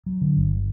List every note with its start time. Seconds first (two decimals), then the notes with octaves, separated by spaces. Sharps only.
0.06 F#3
0.21 D3
0.36 G1